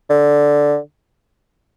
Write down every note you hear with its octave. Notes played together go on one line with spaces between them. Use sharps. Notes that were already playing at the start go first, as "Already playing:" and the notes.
D3